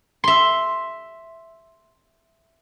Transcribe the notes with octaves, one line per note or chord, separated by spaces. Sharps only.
E5 C6